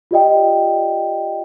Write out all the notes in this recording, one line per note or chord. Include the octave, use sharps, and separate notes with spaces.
F4 G4 D5 D#5 G5